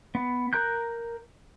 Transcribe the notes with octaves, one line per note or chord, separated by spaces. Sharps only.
B3
A#4 A#5 F#6 G6